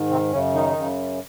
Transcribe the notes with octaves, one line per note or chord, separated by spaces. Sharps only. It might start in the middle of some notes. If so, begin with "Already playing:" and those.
Already playing: G#2 D#3
C3 C4
F#2 C#3 C#4
D#3 D#4
F#2 C#3